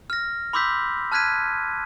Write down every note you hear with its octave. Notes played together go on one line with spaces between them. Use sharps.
F6 A#6
B5 C6 D6 E6 G6 B6
A5 F6 F#6 G#6 B6 D#7